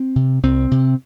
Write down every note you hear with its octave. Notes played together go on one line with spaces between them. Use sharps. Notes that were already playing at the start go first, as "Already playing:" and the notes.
Already playing: C4
C3
C2 C4
C3